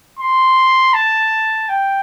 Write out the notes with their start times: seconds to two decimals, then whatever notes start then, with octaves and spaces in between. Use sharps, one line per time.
0.19 C6
0.94 A5
1.69 G5